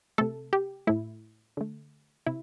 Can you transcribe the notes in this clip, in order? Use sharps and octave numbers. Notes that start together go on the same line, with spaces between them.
C3 A3 A4
G4
A2 A3 E4
D3 A3
C3 E4